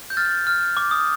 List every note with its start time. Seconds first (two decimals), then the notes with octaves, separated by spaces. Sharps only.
0.10 G6
0.17 F6 A6
0.47 F6
0.77 D6
0.91 D#6